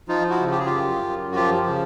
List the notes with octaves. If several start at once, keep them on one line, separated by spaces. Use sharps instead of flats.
F3 D#4 F4
E4 F#4
C#3
G4
G#4
F4 G4
F#2
F#2
F#4
F3 F4 G4
C#3